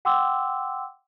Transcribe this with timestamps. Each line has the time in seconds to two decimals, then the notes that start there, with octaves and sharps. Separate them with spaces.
0.05 F#5 G5 C6 D6 E6